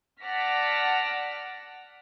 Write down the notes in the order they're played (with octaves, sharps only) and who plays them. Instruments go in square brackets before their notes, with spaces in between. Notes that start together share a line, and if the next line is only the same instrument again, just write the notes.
[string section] D5 F#5 A5 F6 A#6 B6